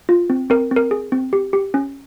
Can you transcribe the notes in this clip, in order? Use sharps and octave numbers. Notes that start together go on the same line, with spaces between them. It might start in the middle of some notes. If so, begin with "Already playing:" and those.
F4
C4
C4 A#4
C4
A#4
G#4
C4
G4
G4
C#4